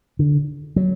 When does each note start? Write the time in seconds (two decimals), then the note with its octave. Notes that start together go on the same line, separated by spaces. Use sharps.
0.19 D3
0.76 F#3